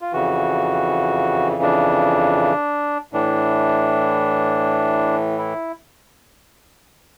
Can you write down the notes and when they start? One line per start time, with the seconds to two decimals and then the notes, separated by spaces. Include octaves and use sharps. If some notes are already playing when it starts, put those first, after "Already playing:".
0.01 F4
0.13 F2 C#3 E3 F#4
1.62 D4
3.13 A2 E3 D4
5.38 E4